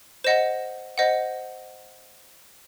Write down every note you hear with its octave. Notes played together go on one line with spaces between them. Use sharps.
C5 D#5 F#5 E7
C5 D#5 F#5